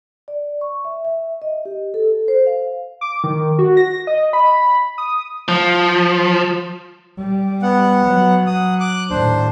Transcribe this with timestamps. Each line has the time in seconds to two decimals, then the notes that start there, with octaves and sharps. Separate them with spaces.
0.28 D5
0.61 C#6
0.85 E5
1.05 E5
1.42 D#5
1.65 G4
1.94 A4
2.28 C5
2.46 F5
3.01 D6
3.24 D#3
3.59 F#4
3.77 A#6
4.07 D#5
4.33 B5
4.98 D#6
5.48 F3
7.18 G3
7.62 B3 F#5
8.07 F#3
8.47 F#5 D#6
8.80 D6 F#6
9.10 D#2 A2 D4 C5